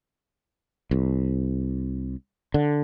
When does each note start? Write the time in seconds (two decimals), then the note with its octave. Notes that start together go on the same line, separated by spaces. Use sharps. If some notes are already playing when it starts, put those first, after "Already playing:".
0.91 C2
2.54 D3